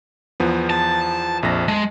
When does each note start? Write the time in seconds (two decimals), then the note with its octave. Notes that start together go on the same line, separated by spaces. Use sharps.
0.40 E2 F3 B3
0.70 A5
1.43 A#1 F2 A#6
1.68 G#3 A5